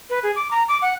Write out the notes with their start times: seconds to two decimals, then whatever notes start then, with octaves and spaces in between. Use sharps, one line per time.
0.10 B4
0.23 G#4
0.36 D6
0.51 A#5
0.68 D6
0.82 F#5